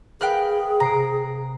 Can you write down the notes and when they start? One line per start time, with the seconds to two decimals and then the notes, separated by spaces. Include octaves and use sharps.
0.21 G#4 A#4 B4 F5 G5 F6 F#6
0.80 C3 A#5 C7 D7